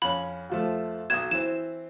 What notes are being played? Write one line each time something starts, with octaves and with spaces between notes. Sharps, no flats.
F2 C#4 B5
F2 F3 A3
B1 F#4 D#6 G#6 E7
E3 C4 E7